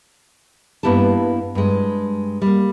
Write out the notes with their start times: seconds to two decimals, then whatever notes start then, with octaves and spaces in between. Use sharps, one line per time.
0.83 G2 A#3 B3 E4 G4 A5
1.55 G2 G#3
2.42 G3 A#3